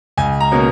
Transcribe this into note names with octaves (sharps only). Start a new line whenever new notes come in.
C#2 G#5
A#5
B2 A#3 C#4